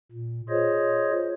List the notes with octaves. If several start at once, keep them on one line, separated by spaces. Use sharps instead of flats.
A#2
F4 G#4 C5 C#5 D#5